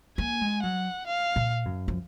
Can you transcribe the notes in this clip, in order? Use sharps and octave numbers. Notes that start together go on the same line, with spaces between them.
A#3 G#5
G#3
F#3 F#5
F5
A#2
F#2
F3